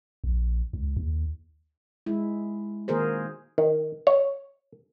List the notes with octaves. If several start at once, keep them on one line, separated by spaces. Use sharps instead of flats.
A#1
C#2
D#2
G#3 E4
D#3 A#3 F#4 G#4 A#4 C5
D#3
C#5